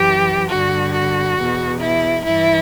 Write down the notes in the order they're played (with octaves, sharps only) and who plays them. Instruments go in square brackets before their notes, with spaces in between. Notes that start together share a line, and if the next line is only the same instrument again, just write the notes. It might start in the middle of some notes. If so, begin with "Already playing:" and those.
Already playing: [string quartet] F#2 E3 G4
G2 D3 F#4
F#4
E2 B2
E4
G2 E3 E4